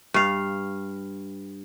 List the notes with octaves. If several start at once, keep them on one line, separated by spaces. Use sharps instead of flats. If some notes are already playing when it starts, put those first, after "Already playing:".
G2 F5